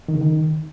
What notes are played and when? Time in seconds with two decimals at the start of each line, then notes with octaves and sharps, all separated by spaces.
0.08 D#3
0.15 C#3
0.21 D#3